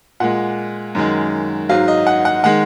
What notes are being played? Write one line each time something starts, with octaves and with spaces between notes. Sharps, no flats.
A#2 G#3 F#5
F#2 D#3 G#3
G#2 F#3 F5
D#5
F#5
F#5
D#3 G#3 F#5